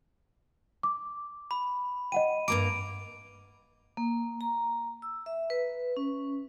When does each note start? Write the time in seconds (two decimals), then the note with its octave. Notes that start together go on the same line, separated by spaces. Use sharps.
0.83 D6
1.51 B5
2.12 D#5 F#5 G5 D#7
2.48 G2 A#3 A#5 D6 D7
3.97 A#3
4.41 A#5
5.02 E6
5.26 E5
5.50 B4
5.97 C#4